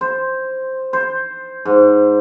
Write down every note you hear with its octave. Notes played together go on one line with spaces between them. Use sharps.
C5
C5
G#2